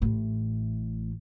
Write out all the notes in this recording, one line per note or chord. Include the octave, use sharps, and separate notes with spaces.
A1 A2